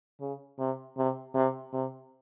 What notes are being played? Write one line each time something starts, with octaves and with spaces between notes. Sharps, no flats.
C#3
C3
C3
C3
C3